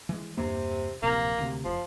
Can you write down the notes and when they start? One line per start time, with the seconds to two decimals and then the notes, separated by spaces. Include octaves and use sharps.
0.09 E3 G#3
0.37 E2 G2 C3 A#3
1.03 D1 A#1 C3 A#3
1.38 D2 C3
1.64 F1 F3